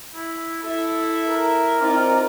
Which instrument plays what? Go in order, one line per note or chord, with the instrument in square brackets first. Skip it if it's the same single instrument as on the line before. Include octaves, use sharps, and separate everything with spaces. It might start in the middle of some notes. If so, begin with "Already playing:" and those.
[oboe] E4
[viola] E4 E5 [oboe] A4
[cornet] A#4
[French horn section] C4 D#4 [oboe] F4 [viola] D5